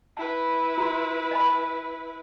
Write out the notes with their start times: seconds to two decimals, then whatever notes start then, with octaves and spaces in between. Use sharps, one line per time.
0.17 E4 B4 A5
0.78 F4 F#4 C6
1.31 D#5 G#5 B5